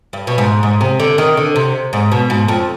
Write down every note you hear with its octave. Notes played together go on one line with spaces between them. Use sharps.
G2
B2
G#2
G#2
C3
D3
D#3
D3
C3
G#2
B2
G#2
F2